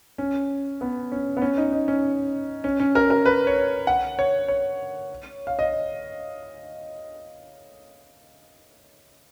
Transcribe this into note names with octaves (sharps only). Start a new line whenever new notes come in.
C#4
B3
C#4
B3
C#4
D#4
D#4
C#4
C#4
C#4
A#4
A#4
B4
C#5
F#5
C#5
C#5
F5
D#5